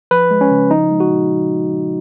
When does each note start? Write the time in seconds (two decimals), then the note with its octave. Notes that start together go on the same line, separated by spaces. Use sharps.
0.11 F3 B4
0.31 G#3
0.41 C#4
0.51 C#3
0.70 F3 D#4
0.90 G#3
1.00 F#4
1.10 A#2